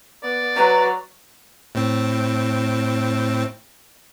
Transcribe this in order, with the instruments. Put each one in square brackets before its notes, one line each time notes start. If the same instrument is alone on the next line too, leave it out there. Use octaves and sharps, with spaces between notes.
[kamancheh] B3 [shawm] D5
[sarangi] F#3 [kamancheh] F#4 A#5 [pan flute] B4
[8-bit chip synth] A2 C4